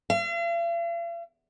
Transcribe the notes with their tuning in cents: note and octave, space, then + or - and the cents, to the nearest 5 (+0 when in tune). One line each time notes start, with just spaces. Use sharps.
F5 -45